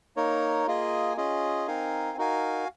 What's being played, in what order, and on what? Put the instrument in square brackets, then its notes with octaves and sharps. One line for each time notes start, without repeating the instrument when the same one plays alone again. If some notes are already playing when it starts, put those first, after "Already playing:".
[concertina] A#3 D#4 A#4 C#5
A#3 F4 G#4 D#5 G#5
C#4 F4 G#4 D#5
C4 D#4 A#4 F5 G#5
D#4 F#4 A#4 F5 G#5